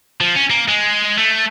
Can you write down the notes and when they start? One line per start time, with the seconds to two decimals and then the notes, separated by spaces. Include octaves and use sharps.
0.21 F3
0.36 C#4
0.50 A#3
0.68 G#3
1.18 A3